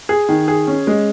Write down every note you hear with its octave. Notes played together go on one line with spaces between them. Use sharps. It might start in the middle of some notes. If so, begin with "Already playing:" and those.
G#4
D#3
G#4
C#4
G#3